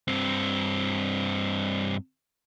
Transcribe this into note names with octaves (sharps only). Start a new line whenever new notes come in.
G2 C4